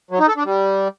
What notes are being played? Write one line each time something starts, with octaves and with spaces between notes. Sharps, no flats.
F#3
D#4
A4
D4
G3